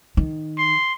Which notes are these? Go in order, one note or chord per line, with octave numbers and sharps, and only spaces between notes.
D#3
C6